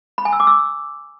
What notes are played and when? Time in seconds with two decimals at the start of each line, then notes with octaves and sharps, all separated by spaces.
0.18 B5
0.25 G#5
0.33 E6
0.40 D6
0.47 E6